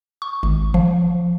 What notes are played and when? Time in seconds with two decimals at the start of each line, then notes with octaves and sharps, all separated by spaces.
0.22 C#6
0.43 G#1
0.74 F3